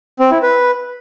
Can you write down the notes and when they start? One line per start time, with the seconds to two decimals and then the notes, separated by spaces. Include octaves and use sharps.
0.19 C4
0.31 E4
0.43 B4